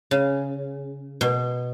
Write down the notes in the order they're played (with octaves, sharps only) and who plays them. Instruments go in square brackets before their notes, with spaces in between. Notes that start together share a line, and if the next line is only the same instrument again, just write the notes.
[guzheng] C#3
B2